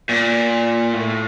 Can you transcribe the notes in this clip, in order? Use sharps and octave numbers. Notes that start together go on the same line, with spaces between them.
A#2
A2